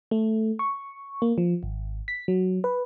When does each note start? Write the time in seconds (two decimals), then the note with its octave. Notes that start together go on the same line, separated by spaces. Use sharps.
0.11 A3
0.59 C#6
1.22 A#3
1.38 F3
1.63 G#1
2.08 B6
2.28 F#3
2.64 B4